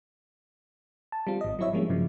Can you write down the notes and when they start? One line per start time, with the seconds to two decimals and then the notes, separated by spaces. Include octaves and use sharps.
1.12 A5
1.27 G3 C4 F4
1.41 G#1 D#5
1.59 F#3 C4 E4 C#5 E5
1.73 F3 G3 G#3 A#3 C#4
1.89 G2 C#3 F3 F#3